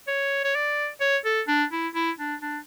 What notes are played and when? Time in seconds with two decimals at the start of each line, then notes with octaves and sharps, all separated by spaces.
0.08 C#5
0.45 C#5
0.55 D5
1.01 C#5
1.25 A4
1.48 D4
1.72 E4
1.95 E4
2.19 D4
2.42 D4